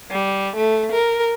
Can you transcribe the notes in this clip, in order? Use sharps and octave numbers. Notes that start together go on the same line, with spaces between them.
G3
A3
A#4